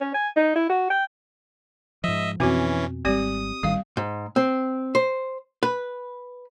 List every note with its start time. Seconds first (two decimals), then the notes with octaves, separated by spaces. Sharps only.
0.01 C#4
0.14 G#5
0.36 D#4
0.56 E4
0.70 F#4
0.90 G5
2.04 G#2 F3 D#5 E5
2.40 F2 B2 E3 C4 C#4 F#4
3.05 G#1 G3 C4 G4 D5 D#6
3.63 A1 D#3 G3 F5
3.97 G#2
4.36 C4
4.95 C5
5.63 B4